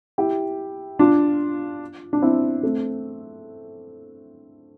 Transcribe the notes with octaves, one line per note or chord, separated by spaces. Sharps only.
E4 G4
D4 F4
D4
C4 E4
A3 C4